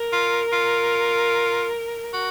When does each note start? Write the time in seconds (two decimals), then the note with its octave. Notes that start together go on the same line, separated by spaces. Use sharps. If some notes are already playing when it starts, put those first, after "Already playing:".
Already playing: A#4
0.12 F4
0.53 F4
2.13 F#4